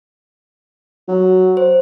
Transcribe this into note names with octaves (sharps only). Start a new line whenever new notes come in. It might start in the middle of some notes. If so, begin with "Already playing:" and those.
F#3
C5